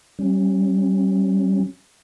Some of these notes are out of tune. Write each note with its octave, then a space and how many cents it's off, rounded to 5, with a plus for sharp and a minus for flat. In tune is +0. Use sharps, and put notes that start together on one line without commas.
G3 -30 C#4 -25